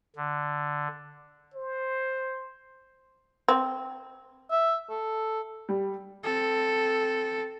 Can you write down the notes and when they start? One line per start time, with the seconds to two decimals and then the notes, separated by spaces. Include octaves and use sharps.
0.16 D3
1.54 C5
3.48 C4
4.51 E5
4.90 A4
5.69 G3
6.23 C4 A4